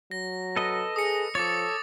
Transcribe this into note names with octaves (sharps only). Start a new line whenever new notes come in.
F#3 A#6
A4 B4 D#5
G#4 D#6 C#7
F3 A4 C#5 D6 A6